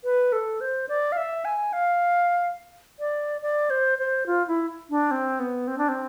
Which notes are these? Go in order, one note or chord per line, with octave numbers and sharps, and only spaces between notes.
B4
A4
C5
D5
F5
E5
G#5
F5
D5
D5
C5
C5
F4
E4
D4
C4
B3
C4
D4
C4